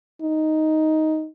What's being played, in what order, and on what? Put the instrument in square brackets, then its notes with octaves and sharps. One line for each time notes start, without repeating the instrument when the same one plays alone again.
[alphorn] D#4